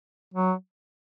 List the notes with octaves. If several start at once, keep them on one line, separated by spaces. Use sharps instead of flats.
F#3